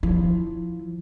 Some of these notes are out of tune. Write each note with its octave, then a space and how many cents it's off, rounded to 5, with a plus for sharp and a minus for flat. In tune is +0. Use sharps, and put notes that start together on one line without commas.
F3 +0 E4 +0